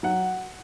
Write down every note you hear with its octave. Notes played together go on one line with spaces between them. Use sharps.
F#3 F#5